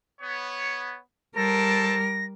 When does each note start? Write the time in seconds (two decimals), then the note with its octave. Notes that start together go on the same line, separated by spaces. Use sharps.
0.21 B3 C#5
1.36 G3 A4 A#4 C5 A5 A#6